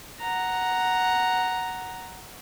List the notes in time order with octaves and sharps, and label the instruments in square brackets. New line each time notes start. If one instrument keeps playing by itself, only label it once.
[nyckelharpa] F#5 A#5